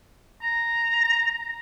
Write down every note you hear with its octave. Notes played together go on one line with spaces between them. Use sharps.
A#5